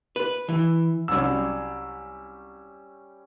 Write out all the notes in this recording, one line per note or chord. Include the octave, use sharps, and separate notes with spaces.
B4
E3
C2 F#3 G3 C#4 E6